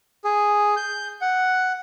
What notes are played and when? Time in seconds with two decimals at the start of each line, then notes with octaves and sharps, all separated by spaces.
0.24 G#4
0.76 G6
1.21 F#5